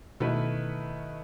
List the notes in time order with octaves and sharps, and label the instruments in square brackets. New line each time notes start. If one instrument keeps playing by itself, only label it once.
[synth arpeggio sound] B2 [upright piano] D#3 A3 E4 B4